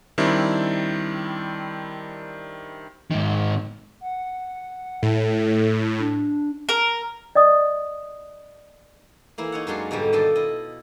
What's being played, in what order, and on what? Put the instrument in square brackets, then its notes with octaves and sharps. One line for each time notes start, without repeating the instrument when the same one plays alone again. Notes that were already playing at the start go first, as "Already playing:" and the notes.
[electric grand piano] D#3 G3 C4 D4 E4
[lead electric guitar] G#2 D#3
[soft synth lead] F#5
[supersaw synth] A2 [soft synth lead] A4
[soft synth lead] D4
[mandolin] A#4
[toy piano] D5 D#5 D#6
[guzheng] E3 A#3 E4
D#4 C#5 F#5
F#2 G#3 D4 F4 F#4 C6
G#2 B2 D3 G3
D#3 D4 F4 A4 D#5 A5
E4 D#5